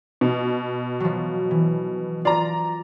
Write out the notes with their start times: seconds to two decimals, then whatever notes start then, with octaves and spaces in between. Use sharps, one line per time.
0.21 B2
1.00 F3 F#3
1.51 E3
2.25 F4 D5 A#5